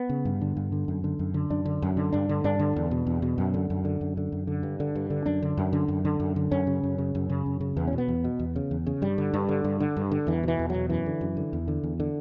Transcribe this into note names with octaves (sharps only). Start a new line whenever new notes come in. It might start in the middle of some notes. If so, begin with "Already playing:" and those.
Already playing: B3
C#3
G2
D3
G2
D3
F#2
D3
F#2
D3
F#2 D4
D3
F#2
D3
G2 D4
D3
G2 D4
D3
E2
B2
E2
B2
F#2
D3
F#2
D3
F#2
D3
F#2
D3
G2
D3
G2
D3
F#2 D4
D3
F#2
D3
F#2
D3
F#2
D3
F#2 C#4
C#3
F#2
C#3
F#2
C#3
F#2
C#3
E2 B3
C#4
B2
B3
E2
B2
E2
C#3
E2
C#3
G2 G3
D3
G2
D3
G2
D3
G2
D3
E2 E3
B2 E3
E2
B2 F#3
F#2 E3
D3
F#2
D3
E2
D3
E2
D3